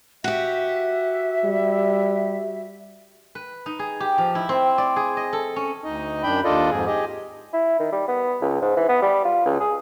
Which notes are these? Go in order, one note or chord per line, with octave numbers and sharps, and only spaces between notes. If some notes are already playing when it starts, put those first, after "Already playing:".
F#4 G4 E5
G3
B4
D#4
G#4
G4
F3
E4
C4
D5
G#4
D#5
A4
C#4
D2 D#4 D#5
F#2 D4 G5 B5 G6
D#2 D4 F4 A4 D5 D#5
F2 G#2 G#4
G4 G#4 D#5
E4
D#3
G3
B3
C#2
G#2
E3
B3
G3
F4
C#2
G#4